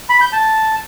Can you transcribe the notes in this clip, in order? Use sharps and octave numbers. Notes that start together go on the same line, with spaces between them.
B5
G6
A5